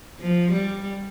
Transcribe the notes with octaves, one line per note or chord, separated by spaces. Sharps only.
F3
G3